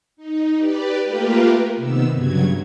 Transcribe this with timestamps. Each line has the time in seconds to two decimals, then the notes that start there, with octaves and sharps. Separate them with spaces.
0.17 D#4
0.56 G4 B4 D5
1.03 A3 A#3 F4 G4 A#4 B4
1.76 C3 D#3 B3 E6
2.13 G2 C#3 F#3 G#6